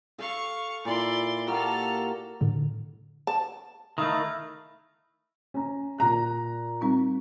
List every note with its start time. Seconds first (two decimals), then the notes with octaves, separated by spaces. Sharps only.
0.18 A4 F5 C#6
0.85 A#2 E4 D5 C6
1.47 A#3 F#4 G4 A4 F6
2.41 A2 D3
3.27 A5
3.98 D#3 A3 E4 F5 A#5
5.54 C#4 A#5
5.98 A#2 A#5 F#6
6.81 G3 C4 D#4